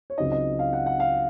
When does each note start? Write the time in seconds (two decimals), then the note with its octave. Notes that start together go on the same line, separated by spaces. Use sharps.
0.10 C#5
0.17 C#2 C#3 F#3 C4 D#4 D#5
0.32 D#5
0.59 F5
0.73 F#5
0.86 F#5
1.00 F5